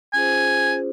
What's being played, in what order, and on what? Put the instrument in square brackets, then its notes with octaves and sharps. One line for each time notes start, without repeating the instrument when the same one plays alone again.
[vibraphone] C#4 F4 G#4 C5 [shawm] G#5